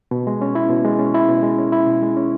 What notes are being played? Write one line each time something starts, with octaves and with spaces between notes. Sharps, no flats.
B2
G#3
C#4
E4
B2
G#3
C#4
E4
B2
G#3
C#4
E4
B2
G#3
C#4